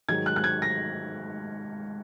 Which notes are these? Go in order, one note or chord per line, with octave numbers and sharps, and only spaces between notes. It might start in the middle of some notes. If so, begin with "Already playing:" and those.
G#2 D#3 F#3 G#6
F#6
F#6
G#6
A#6